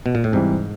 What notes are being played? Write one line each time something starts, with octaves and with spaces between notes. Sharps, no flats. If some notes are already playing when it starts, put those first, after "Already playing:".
B2
A#2
A2
G#2 C3 E3 G3